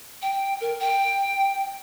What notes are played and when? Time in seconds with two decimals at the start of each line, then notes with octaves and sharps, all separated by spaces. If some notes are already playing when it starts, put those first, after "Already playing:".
0.22 G5
0.61 A#4
0.80 G5